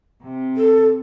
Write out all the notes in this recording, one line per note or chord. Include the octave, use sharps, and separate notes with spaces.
C3
A4